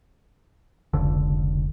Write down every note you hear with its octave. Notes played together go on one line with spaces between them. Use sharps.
F1 C#2 D3